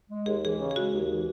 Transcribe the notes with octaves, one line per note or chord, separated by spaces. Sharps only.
G#3
D#2 G#4
E3 G#4
C#3
G#4
G#3 F#4
D#2
E3